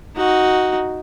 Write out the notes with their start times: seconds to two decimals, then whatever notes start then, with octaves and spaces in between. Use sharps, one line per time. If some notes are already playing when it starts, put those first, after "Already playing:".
0.15 D#4 F#4